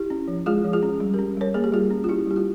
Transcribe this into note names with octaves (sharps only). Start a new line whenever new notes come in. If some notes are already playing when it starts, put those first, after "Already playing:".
Already playing: E4 G4
C#4
F3
G#3 F4 G#4
F3
F4 G#4
C#4
G3
G4 A#4
C#4
G3 A#4 C#5
A#3 G#4
G4
G3 F4 G#4
C#4
F4
C#4 E4 G4
G3 G4
F4